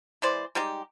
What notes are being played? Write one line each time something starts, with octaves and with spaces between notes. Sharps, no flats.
E3 G#3 C5 D5
G3 G#3 D#4 G4